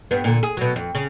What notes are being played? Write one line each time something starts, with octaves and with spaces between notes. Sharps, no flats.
G2 B3
A#2 D3
G#4
B2 F#3
F2
C#3